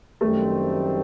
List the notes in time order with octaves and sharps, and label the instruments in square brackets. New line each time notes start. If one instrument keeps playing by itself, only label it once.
[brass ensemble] F#2 D#3 G3 C4 [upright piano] A3